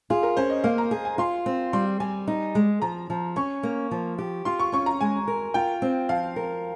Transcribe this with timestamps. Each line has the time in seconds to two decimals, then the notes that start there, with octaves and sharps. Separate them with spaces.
0.10 F4 G#4
0.23 A#4
0.37 C#4 C5
0.50 D#5
0.64 A#3 F5
0.78 A#5
0.91 G#4
1.05 G#5
1.18 F4 C6
1.46 C4
1.73 G3 C6
2.00 G3 G#5
2.28 D#4
2.55 G#3
2.82 F3 A#5
3.10 F3
3.36 C#4 C#6
3.63 A#3
3.91 F3
4.19 G4
4.45 F4 C6
4.60 C#6
4.72 C#4 C#6
4.86 A#5
5.01 G#3 G#5
5.28 A#4
5.54 F4 G5
5.82 C4
6.09 F3 F5
6.36 A#4